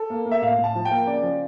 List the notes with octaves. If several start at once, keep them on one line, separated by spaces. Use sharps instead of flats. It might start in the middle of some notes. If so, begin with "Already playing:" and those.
Already playing: A4
A#3
A#3
E5
A2 F5
A2
A5
F3
G5
A#3
C#3 D5
F3